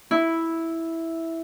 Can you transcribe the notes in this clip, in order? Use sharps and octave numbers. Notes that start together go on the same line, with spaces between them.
E4